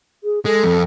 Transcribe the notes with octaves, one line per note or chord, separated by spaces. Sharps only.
G#4
G#3 A4
F2